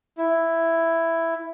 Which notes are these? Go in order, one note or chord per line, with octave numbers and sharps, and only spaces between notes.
E4